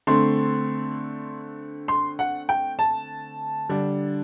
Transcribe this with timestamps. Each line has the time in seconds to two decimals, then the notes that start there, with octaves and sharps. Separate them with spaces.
0.07 D3 A3 C4 C6
1.88 C6
2.19 F#5
2.49 G5
2.79 A5
3.69 D3 G3 D4